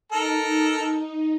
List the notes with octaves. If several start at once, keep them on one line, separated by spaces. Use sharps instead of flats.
D#4 A4 A#4